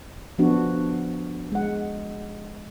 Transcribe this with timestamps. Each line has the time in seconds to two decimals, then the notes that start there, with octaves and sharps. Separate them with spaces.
0.38 F3 B3 D4 F#4
1.52 G#3 F#5